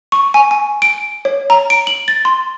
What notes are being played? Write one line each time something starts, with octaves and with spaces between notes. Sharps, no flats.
C#6
G#5
G#5
D7
C#5
A#5
D7
F#7
A6
C6